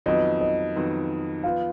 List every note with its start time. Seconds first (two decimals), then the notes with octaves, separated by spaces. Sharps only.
0.06 F2 D#3 F#3 B3 D#5
0.41 D#5
0.76 F2 D#3 F#3 B3
1.44 F3 B3 F4 F5